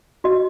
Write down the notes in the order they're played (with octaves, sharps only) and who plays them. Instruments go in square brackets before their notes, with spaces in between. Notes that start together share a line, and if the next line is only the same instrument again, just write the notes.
[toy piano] F#4 D#5